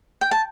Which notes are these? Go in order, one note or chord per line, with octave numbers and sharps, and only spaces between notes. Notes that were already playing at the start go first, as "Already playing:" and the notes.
G5
A5